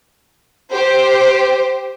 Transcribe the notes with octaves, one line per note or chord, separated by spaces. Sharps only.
G4 C5